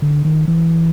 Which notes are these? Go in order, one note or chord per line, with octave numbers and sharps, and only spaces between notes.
D3
D#3
E3